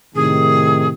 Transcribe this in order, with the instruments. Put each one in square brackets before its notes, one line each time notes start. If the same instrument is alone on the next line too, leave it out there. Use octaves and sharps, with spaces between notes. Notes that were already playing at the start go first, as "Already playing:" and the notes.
[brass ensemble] A2 C3 D#3 [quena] G#4